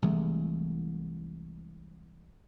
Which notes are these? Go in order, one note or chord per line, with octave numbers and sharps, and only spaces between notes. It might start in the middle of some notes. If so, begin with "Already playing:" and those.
C2 E3 G#3 A3